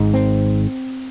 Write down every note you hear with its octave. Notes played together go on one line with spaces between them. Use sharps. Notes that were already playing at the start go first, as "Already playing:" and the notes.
Already playing: G#1 G#2
C4